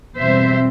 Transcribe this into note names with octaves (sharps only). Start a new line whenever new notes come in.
E2 B2 G3 C4 C5 E5